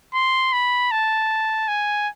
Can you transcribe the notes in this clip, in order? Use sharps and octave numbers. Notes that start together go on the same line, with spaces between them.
C6
B5
A5
G#5